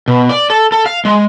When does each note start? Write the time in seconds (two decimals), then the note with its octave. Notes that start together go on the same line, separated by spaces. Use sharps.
0.08 B2
0.29 D5
0.50 A4
0.72 A4
0.86 F5
1.05 G#3